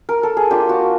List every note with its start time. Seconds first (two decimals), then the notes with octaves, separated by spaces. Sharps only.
0.09 A#4
0.23 A4
0.37 G#4
0.50 A#3 D4 F4 G4
0.69 F#4